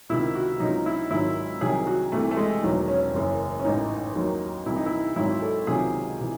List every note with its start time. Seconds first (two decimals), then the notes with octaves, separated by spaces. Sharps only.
0.09 C#2 C3 D#3 E4
0.35 F#4
0.60 C#2 C3 F#3 D#4
0.86 E4
1.10 G#1 G#2 D#3 F#3 E4
1.61 C2 C3 D#3 F#3 G#4
1.87 F#4
2.12 C2 C3 E3 A3
2.31 A3
2.37 G#3
2.63 E1 E2 D#3 F#3
2.88 C#4
3.14 F#1 F#2 E3
3.60 C#4
3.64 A1 G#2 E3 D#4
4.15 D#2 D#3 F#3
4.66 C2 C3 E3 E4
4.76 D#4
4.86 E4
5.16 G#1 G#2 F#3 E4
5.42 A4
5.67 C#2 C3 D#3 F#3 G#4
6.20 C3 E3